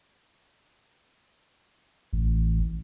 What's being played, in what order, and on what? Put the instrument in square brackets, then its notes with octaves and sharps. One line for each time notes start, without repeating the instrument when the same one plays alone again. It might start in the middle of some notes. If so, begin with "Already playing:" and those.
[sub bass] A1